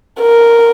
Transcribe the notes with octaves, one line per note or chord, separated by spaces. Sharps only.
A#4